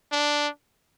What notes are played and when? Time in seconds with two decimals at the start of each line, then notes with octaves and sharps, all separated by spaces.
0.12 D4